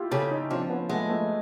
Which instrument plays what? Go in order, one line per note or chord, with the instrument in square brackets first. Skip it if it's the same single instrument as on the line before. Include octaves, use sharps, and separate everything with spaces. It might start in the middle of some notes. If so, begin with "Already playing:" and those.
Already playing: [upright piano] E4 F4 G4
[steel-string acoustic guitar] C#3 [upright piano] G4 A4
[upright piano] C#4 D#4
[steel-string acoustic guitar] F3 [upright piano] C4 D4
[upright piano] B3 C#4
[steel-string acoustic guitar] G#3 [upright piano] A3 B3
[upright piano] A3 B3